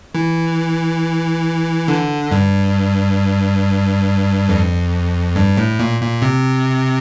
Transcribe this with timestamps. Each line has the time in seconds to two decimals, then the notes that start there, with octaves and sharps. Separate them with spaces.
0.14 E3
1.88 D3
2.31 G2
4.49 F2
5.35 G2
5.57 A2
5.79 A#2
6.01 A#2
6.22 C3